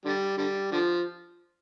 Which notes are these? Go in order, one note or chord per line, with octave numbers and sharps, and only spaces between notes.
D3 G3
D3 G3
D3 F3